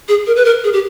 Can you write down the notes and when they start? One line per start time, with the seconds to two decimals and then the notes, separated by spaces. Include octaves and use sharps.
0.08 G#4
0.27 A#4
0.36 B4
0.45 A#4
0.64 G#4
0.73 G4